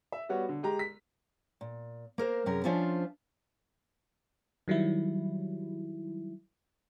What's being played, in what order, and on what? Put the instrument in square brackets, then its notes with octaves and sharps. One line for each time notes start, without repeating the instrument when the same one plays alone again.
[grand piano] E5
G3 B3 F#4 C#5
D3
G#3 G4 A#5
B6
[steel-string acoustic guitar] A#2
A#3 A#4 C5 F5
F#2 C3 C#4 G#4 A#4
F3 C#4 D4 F4 C5 E5
[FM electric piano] D#3 F#3 G3 E4